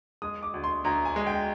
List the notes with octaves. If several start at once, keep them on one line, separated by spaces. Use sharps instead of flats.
G#3 D#6
D6
D2
C6
D2 A#5
G#5
G#3
G5